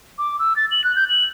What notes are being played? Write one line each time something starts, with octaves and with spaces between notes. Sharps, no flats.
D6
E6
A6
F#7
F#6
G6
F#7